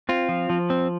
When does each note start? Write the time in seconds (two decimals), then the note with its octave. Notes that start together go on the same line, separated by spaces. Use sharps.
0.09 C4 F4
0.29 F3
0.50 F3
0.70 C4